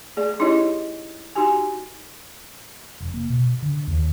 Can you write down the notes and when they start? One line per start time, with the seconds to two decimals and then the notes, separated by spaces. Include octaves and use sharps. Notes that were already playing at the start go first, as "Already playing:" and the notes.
0.17 A3 G#4 D5
0.39 C#4 D#4 E4 G4 C#5 D#5
1.35 D#4 F#4 G4 G#5
3.00 F1
3.14 A#3
3.30 B2
3.62 D3
3.87 D#2